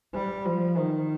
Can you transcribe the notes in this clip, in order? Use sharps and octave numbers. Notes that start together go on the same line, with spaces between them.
G3
F3
D#3